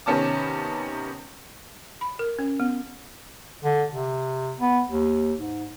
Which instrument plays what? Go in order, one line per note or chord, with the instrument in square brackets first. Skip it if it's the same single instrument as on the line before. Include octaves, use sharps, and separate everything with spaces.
[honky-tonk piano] C3 D#3 B3 C#4 A5 D6
[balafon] B5
A#4
C#4
B3
[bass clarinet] D3
C3
B3
D#2
G#2